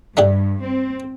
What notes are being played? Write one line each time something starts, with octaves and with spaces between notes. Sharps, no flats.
G2 A3 D4 G4
C4